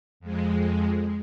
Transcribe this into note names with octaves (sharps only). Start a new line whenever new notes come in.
F2 G#3